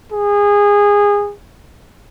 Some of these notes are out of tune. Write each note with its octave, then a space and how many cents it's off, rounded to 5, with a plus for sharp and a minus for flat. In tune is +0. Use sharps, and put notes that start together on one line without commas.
G#4 -20